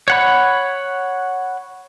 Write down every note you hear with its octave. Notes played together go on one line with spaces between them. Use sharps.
C#5 F#5 B5